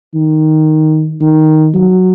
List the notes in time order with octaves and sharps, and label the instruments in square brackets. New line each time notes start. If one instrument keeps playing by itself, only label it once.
[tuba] D#3
D#3
F#3